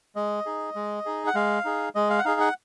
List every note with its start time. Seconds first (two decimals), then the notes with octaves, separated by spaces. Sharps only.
0.16 G#3 D#5
0.46 D#4 G#4
0.75 G#3
1.06 D#4 G#4
1.27 F#5
1.35 G#3 F5
1.65 D#4 G#4
1.95 G#3 D#5
2.10 F5
2.19 F#5
2.25 D#4 G#4 F5
2.40 F#5